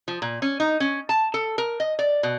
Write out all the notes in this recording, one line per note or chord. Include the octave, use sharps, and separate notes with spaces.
F3
A#2
C#4
D#4
C#4
A5
A4
A#4
D#5
D5
B2